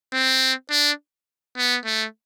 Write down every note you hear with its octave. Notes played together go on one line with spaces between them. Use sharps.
C4
D4
B3
A3